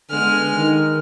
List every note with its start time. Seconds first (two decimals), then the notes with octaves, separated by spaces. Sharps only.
0.10 D3 G#3 B3 F6
0.54 D#3